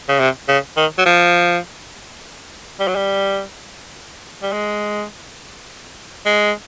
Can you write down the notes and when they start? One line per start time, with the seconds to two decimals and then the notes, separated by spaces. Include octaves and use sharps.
0.08 C#3
0.19 C3
0.48 C#3
0.77 D#3
0.98 F#3
1.06 F3
2.80 G3
2.87 F#3
2.95 G3
4.42 G3
4.52 G#3
6.25 G#3